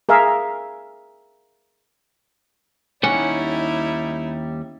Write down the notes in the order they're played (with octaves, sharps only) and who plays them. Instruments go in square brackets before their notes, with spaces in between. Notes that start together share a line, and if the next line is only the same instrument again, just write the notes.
[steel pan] G#4 A#4 E5 F5
[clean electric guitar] D#2 G3 F#5 [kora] C#4 [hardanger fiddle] D#4 E4